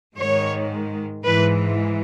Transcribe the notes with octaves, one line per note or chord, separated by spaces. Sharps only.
G#2 D#3 G#3 C#5
G#2 E3 G#3 B4